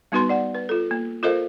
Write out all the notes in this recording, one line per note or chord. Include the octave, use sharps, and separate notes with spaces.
G3 B3 D#4 F#4 B4 C6
D5 F#5
B4
F4 A4
A#3
F4 A4 A#4 C5 D#5 F5